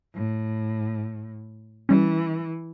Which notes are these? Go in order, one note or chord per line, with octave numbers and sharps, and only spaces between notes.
A2
E3 G3 C#4